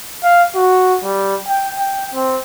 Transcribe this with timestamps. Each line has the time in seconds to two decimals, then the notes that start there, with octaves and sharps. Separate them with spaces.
0.23 F5
0.55 F#4
1.03 G3
1.47 G5
1.78 G5
2.14 C4